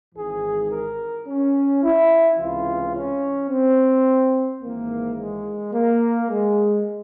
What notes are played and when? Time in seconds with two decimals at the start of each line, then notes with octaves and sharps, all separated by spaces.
0.15 G#1 G#2 E3 G#4
0.71 A#4
1.27 C#4
1.82 E4
2.39 C#2 C3 E3 F4
2.94 C#4
3.50 C4
4.62 G#1 G#2 E3 A#3
5.17 G#3
5.73 A#3
6.29 G#3